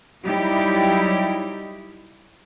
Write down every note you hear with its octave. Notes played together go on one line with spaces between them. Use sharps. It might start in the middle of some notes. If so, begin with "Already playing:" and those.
F#3 G3 D#4 E4 G4